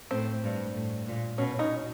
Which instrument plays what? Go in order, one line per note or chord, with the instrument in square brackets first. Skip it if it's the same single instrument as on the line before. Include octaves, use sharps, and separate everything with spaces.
[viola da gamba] A2 [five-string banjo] C4
[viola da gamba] G2
A2
A#2
[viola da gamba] B2 [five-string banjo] C#4
[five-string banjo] C#4 D#4